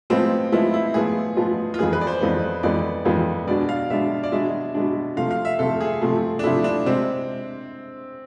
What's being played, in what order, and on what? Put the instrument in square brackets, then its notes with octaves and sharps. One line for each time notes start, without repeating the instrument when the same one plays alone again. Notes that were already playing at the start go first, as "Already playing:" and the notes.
[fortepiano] A2 F3 G#3 B3 F4 [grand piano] C4
[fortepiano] A2 F3 G#3 B3 F4 [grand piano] E4
[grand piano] E4
[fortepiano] A2 F3 G#3 B3 F4 [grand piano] G#4
[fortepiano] A2 F3 G#3 B3 F4
[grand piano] F4
[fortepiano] F2 E3 G#3 B3 [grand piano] G#4
[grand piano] B4
D5
C5
[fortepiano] F2 E3 G#3 B3
[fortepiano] F2 E3 G#3 B3 [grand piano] D5
[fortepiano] F2 E3 G#3 B3
[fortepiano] B2 G#3 D4 [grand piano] D5
[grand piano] F5
[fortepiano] B2 G#3 D4 [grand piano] E5
[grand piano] D5
[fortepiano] B2 G#3 D4 [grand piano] E5
[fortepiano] B2 G#3 D4
[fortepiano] C3 F3 A3 [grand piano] F5
[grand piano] F5
E5
[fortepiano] C3 F3 A3 [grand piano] A4
[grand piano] G#4
[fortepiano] C3 F3 A3
[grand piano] D4
[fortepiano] C3 F3 A3 [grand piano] E4
[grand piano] D4
[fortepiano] C3 G#3 [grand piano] C4